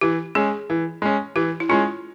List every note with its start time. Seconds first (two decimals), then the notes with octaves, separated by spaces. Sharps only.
0.01 E3 G4
0.35 G#3 C#4 G#4
0.70 E3
1.02 G#3 C#4
1.36 E3 G4
1.60 E4
1.69 G#3 C#4 F4